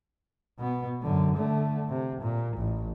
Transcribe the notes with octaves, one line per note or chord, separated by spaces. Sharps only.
B2 B3
F#2 D3
D3 A3
C3
A#2
A1